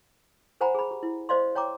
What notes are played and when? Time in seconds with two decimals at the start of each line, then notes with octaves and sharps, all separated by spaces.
0.61 A#4 C5 F#5 G#5 A#5 B5
0.75 G#4 B5
0.91 G4
1.03 E4
1.29 C5 D5 D#5 F5 C6
1.55 C#5 G5 A#5 D6